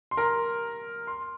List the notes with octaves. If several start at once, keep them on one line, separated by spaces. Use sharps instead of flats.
C6
A#4 A#5
C6